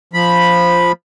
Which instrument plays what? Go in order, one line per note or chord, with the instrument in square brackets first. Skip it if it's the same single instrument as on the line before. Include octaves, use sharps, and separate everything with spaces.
[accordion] F3 B5